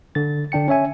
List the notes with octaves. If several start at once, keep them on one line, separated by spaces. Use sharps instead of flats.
D3 A6
D3 D4 G5 C#7
C#4 C#5 E5 G#5